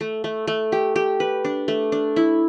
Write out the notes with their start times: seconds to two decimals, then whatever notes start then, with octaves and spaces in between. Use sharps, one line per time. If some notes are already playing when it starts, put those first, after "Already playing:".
0.01 A3
0.24 A3
0.47 A3
0.72 G4
0.96 G4
1.20 B4
1.45 D4
1.68 A3
1.92 D4
2.16 E4